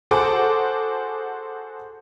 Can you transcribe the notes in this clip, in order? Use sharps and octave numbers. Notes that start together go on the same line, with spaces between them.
F#4 G#4 A4 C5 F#5 D6